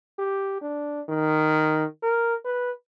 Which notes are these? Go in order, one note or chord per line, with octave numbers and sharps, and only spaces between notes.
G4
D4
D#3
A#4
B4